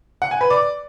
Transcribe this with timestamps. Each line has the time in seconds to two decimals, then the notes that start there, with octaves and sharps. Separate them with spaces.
0.22 F#5
0.31 G#5
0.41 B4
0.50 D5